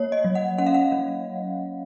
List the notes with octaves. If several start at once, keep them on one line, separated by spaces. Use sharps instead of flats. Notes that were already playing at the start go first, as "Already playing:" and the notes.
Already playing: A#3 C#5
D#5
F#3
F#5
C#4 F#5
F5
F#5
F#3